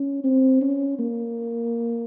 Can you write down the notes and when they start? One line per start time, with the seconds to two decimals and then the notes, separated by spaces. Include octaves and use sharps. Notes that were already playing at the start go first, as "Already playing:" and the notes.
Already playing: C#4
0.24 C4
0.61 C#4
0.99 A#3